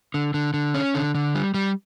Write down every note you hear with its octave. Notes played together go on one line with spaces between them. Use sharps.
D3
D3
D3
C#4
D3
D3
G3
G3